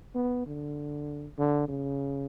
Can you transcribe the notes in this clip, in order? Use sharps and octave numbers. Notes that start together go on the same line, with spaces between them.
B3
D3
D3
C#3